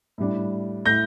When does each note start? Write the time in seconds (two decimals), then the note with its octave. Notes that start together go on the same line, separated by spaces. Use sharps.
0.18 A2 G3 D4
0.85 A2 A3 G6 A#6